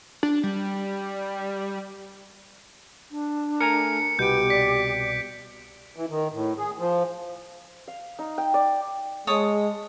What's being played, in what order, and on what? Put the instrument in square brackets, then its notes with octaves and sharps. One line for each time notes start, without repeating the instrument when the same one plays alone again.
[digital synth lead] D4
G3
[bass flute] D4
[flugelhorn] A3 [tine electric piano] A#4 G#5 A#5 [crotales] C#7
[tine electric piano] C2 B2 [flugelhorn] B3 [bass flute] G4 [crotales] G6 D7
[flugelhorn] D5 [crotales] B6
[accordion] E3
D#3
A2
G#4
F3
[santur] F5
D#4
G5
D5
[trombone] G#3 [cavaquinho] C#5 A5 D#6